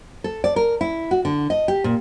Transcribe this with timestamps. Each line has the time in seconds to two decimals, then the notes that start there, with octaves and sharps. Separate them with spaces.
0.24 A4
0.44 D5
0.56 A#4
0.81 E4
1.11 F#4
1.25 D3
1.50 D#5
1.68 G4
1.84 A#2